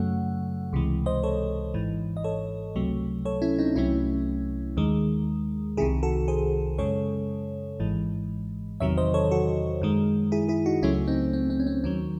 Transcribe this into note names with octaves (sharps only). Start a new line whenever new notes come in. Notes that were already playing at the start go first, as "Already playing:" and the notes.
Already playing: F#2 C#3 F#3 A3 F#5
C#2 C3 E3 G#3
C5 D#5
A4 C#5
G#1 G#2 E3
D#5
A4 C#5
C#2 C3 F#3 A3
A4 C#5
C#4 E4
C4 D#4
C2 C3 F#3 A3 C#4 E4
D#2 D#3 G#3
C2 C3 D#3 E4 G#4
F#4 A4
G#4 C5
F#2 C#3 G#3 A4 C#5
G#1 G#2 E3 G#3
E2 C3 D#3 F#3 C#5 E5
C5 D#5
A4 C#5
F#4 A4
F#2 D#3 G#3
E4 G#4
E4 G#4
D#4 F#4
C#2 C#3 F#3 A3 C#4 E4
C4 D#4
C4
C4
C#4
C4
D#2 D#3 F#3 C#4